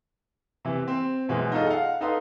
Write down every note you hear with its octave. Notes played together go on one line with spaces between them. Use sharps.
C3 E3
C4
F#2 B2 E3 G#3
D#4 F4 G#4 A4 D#5
F5 F#5
D#4 A4 B4 F5 C6 D#6